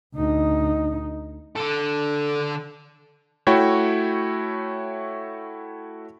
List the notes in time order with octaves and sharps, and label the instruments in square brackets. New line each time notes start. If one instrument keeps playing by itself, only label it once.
[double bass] D2 D#4
[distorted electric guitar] D3 A4
[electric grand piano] A3 E4 F#4 C#5 G5